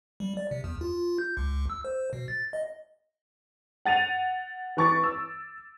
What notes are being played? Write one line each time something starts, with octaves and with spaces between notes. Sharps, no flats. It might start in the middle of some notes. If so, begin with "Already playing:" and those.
G3
D5
C3
E2
F4
G6
C#2
E6
C5
B2
A6
D#5
F#5 A6 D#7 F7
E3 B4 C#6 D6 A6
E6